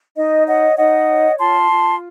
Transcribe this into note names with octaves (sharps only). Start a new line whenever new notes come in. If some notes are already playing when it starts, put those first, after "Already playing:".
D#4 D#5
C#5 D#5 F#5
D#4 D#5 F#5
C#5
F4 A5 C6
F4